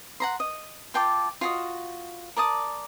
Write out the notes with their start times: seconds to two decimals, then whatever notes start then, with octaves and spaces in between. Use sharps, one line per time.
0.20 F#5 A#5 C6
0.40 D#5
0.94 F4 G5 A5 D6
1.41 F4 F#4 D#5
2.36 A#4 D5 A5 D#6